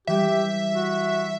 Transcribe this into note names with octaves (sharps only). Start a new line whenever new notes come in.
E3 G3 G4 E5
F#4